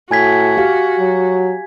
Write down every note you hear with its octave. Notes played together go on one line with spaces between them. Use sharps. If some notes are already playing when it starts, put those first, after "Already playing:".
A2 F#4 G#5 G#6 B6
G4 F5
F#3